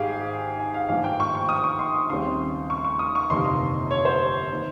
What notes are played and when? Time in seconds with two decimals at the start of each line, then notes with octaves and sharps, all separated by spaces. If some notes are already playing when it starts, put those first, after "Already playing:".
Already playing: G#1 G#2 D#3 G4 G#4 F5
0.59 G#5
0.74 F5
0.89 G#1 G2 F3 A#3 F5
1.04 G5
1.20 C#6
1.35 C#6
1.49 D#6
1.64 C#6
1.79 C6
2.09 D#2 C#3 G3 C4 C6
2.70 C#6
2.85 C#6
2.99 D#6
3.15 C#6
3.29 G1 F2 C3 D#3 A#3 C6
3.91 C#5
4.05 C5
4.51 D#3 A#3